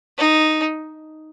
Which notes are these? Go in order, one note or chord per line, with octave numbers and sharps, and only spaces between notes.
D#4